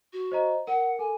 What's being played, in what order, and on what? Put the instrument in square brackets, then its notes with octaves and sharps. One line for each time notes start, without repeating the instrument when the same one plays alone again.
[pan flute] F#4
[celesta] C5 D#5 A#5
[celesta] A#4 [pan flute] F#5
[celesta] A4 [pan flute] G#5